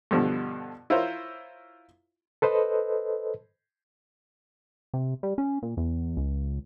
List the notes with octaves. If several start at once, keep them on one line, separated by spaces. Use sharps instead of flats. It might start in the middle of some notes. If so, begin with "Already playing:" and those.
G2 B2 D3 F3
E4 F4 A#4 C5 C#5
A4 B4 C5 D#5
C3
G3
C#4
A#2
E2
C#2